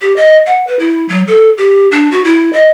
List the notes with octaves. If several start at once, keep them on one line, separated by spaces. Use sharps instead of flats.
G4
D#5
F#5
B4
E4
F#3
A4
G4
D4
F#4
E4
D#5